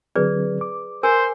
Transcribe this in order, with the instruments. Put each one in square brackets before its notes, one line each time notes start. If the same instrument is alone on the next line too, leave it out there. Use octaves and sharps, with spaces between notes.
[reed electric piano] D3 F#3 C4 [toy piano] G#4 B4 D5
[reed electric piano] D6
[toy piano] A#4 G#5 [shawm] C5